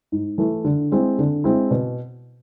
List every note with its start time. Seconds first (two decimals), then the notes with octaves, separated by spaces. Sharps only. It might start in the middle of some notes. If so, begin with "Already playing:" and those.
0.12 G#2
0.38 E3 A3
0.65 D3
0.92 G#3 C4 E4
1.19 D3
1.44 G#3 C4 E4
1.71 B2